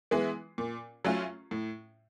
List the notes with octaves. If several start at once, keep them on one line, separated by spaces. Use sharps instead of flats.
E3 G#3 B3 E4
A#2
F#3 A3 C#4 F4
A2